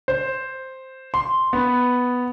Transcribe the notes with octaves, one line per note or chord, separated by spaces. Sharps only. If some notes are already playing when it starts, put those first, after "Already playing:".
C5
C6
B3